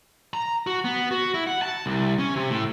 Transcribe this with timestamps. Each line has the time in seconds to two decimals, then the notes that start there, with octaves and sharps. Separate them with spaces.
0.33 A#5
0.67 F#4
0.84 B3
1.11 F#4
1.34 E4
1.47 F#5
1.62 A5
1.86 C2
2.19 C#4
2.36 C3
2.50 A2